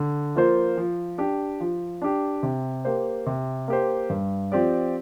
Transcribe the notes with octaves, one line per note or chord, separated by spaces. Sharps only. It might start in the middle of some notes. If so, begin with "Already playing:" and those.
Already playing: D3
F3 A#3 F4 C5
F3
D4 G4
F3
D4 G4
C3
A#3 G4 C5
C3
A#3 G4 C5
G2
F3 C4 G4 D5